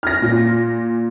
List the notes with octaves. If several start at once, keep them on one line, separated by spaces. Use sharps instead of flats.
F6 A#6
A#2